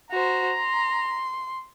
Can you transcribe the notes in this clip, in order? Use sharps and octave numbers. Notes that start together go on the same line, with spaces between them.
F#4 C5 A#5
C6